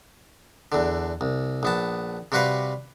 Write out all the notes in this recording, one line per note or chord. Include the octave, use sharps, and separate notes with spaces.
E2 D3
C2
A#1 B3 A5
C3 G3 F#4 B4 F5